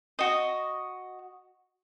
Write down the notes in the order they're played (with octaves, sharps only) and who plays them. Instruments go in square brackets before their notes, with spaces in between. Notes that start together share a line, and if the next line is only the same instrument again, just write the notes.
[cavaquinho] F#4 D#5